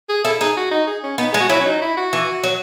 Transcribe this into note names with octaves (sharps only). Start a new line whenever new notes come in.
G#4
E4 A4
D#4 G#4
F#4
D#4
G#4
C#4
B3 D#4
G#3 G#4
F#4
F#3 E4
C#4
D#4
E4
F#4
E3
F#3